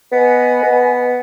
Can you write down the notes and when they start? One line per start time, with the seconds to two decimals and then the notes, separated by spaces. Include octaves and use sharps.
0.12 B3 B4 D#5 G#5 B5
0.63 B3